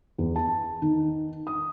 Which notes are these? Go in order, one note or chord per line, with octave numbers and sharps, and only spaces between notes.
E2
A5
D#3
D#6